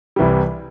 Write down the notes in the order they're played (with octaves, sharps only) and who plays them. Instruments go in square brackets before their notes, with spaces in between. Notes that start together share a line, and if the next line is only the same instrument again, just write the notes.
[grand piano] C2 C3 E3 G3